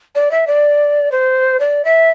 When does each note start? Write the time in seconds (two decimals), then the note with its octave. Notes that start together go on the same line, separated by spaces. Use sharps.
0.15 D5
0.31 E5
0.47 D5
1.12 C5
1.60 D5
1.85 E5